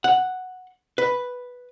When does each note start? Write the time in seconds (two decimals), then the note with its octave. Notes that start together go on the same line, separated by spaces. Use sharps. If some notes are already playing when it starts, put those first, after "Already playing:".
0.04 F#5
0.98 B4